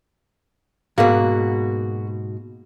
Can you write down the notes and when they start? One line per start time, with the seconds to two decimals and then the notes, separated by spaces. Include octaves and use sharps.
0.98 G#2 B2 A#3 F#4 G#4 A#4